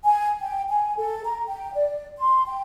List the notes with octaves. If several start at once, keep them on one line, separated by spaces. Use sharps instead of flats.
G#5
G5
G#5
A4
A#5
G5
D5
C6
G5